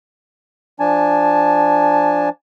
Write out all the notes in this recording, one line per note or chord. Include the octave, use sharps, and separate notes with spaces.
F3 D4 G#5 A5